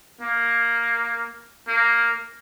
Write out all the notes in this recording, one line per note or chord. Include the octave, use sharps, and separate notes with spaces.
A#3
A#3